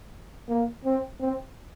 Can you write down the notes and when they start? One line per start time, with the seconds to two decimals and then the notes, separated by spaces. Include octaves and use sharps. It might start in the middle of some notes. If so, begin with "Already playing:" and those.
0.49 A#3
0.85 C4
1.20 C4